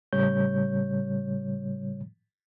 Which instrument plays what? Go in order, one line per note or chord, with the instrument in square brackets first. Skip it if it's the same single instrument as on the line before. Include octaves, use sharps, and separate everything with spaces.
[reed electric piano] A2 C#3 G3 C#5 G6